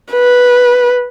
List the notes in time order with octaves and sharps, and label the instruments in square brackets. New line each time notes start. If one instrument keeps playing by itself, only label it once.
[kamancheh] B4